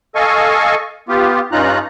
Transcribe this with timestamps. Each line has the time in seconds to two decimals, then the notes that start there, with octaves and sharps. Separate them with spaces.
0.15 A4 D#5 F5 G#5 C#6
1.09 B3 F4 G4
1.52 G2 C#4 D#4 F4 A#5 F#6